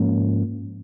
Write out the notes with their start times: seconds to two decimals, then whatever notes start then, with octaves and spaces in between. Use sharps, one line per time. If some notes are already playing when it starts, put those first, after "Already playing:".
Already playing: G#2 F3 A#3 C#4